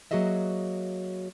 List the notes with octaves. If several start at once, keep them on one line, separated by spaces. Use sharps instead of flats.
F#3 A#3 F#4 G#4 D#5 E5